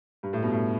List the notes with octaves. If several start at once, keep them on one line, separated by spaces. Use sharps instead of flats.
G2
A2
G2 B2
A2